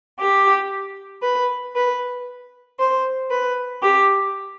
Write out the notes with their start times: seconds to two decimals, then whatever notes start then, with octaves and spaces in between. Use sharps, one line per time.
0.20 G4
1.22 B4
1.75 B4
2.79 C5
3.30 B4
3.82 G4